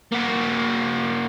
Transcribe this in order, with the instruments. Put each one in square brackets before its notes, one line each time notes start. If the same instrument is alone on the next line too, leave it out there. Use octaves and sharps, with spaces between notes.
[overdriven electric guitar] A#3 F#4